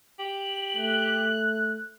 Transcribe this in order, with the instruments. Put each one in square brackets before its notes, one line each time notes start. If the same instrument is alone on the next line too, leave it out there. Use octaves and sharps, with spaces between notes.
[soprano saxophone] G4 [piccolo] F#7
[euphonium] A3 [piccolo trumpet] F#6